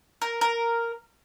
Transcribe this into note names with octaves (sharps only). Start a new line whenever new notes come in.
A#4
A#4